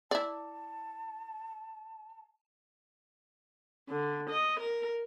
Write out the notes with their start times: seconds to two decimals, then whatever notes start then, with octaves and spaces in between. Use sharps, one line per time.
0.11 E4 D5 A5
3.90 D3
4.30 D#5
4.61 A#4